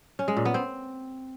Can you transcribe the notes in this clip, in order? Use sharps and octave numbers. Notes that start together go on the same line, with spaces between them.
C#4
G#3
A#2
B3
C4